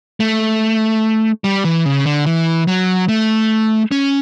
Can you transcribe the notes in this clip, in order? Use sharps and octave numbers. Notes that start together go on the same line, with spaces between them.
A3
G3
E3
C#3
D3
E3
F#3
A3
C#4